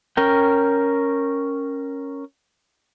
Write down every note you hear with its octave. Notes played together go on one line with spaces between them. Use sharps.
C#4 A#4 G5